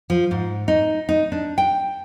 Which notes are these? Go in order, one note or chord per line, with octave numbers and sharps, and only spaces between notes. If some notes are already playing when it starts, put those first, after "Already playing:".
F3
G#2
D#4
D#4
D4
G5